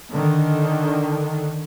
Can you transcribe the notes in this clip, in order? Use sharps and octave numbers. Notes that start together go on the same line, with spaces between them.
D3 D#3